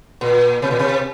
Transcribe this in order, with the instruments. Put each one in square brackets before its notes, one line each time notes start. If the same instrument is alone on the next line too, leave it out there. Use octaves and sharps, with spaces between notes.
[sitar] A#2
C3
A#2
C3